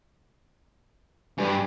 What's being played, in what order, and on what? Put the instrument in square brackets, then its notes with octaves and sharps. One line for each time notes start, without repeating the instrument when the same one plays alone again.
[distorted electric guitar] G2 [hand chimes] G4 B4 G#5